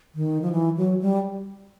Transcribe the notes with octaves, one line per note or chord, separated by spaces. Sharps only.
D#3
F3
E3
F#3
G3